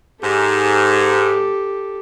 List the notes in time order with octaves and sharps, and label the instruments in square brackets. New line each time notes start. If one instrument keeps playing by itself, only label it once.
[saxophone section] G#2 [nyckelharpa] G4 A4